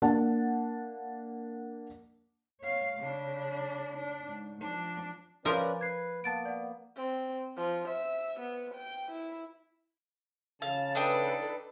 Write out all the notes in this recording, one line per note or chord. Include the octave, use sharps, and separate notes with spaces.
A#3 D4 F#5 A5
C#5 F5
C#3 D4
D4
G#2
F3 D4
F3 C#4 A#4 B4 D5
B4 G#6 C7
A#3 B3 A5 A6 D7
D5 F#5
C4
F3
E5
B3
G5
E4
C#3 F5 A5
D4 D#4 A4 B4 G5